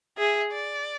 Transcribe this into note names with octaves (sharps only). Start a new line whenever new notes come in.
G#4 E5
D5